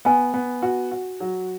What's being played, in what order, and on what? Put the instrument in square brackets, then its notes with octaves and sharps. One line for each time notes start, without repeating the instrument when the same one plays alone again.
[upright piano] B3 [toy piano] G#5
[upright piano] B3
F#4
F#4
F#3